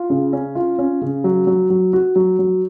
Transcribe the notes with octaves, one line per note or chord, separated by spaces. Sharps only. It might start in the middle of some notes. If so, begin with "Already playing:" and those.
Already playing: F4
C#3
C#4
F4
C#4
C#3
F#3
F#3
F#3
F#4
F#3
F#3